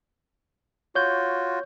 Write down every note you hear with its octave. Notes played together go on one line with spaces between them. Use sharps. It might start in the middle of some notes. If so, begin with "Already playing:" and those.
F4 F#4 C#5 G6